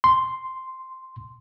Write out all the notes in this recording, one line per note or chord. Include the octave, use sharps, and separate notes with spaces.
C6